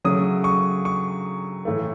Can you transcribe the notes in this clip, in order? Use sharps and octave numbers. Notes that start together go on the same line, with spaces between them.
C#3 F#3 A3 D#6
C#6
C#6
A2 E3 A3